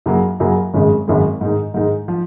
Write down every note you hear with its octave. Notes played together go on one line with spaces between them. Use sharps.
F#2 C#3 F#3 A#3
F#2 C#3 F#3 A#3
G#1 F#2 C#3 G#3
G#1 F#2 C#3 G#3
G#2 D#3 G#3 D#4 G#4
G#2 D#3 G#3 D#4 G#4
F3